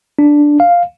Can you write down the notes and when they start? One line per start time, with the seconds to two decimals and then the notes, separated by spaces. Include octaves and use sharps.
0.19 D4
0.60 F5